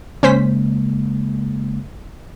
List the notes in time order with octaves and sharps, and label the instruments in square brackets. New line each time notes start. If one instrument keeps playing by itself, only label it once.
[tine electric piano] C#3 G#3 A#3 [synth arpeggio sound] C#4 C5 B6